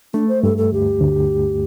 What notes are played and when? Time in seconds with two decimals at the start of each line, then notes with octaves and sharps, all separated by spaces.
0.13 A3 D4
0.28 C5
0.43 G2 A4
0.58 A4
0.72 D2 G4
1.01 D2